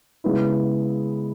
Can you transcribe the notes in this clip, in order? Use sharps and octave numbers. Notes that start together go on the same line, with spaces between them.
C#3 G#3 B3 E4